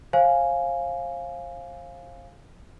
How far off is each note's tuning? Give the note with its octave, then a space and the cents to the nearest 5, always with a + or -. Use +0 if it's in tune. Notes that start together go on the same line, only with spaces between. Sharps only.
C5 +40 F5 +0 G#5 +0